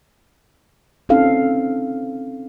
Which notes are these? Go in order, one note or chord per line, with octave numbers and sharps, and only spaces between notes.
C4 C#4 D#4 A4 F5